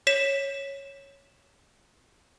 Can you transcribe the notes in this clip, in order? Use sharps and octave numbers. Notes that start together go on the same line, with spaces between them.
C#5 B6 E7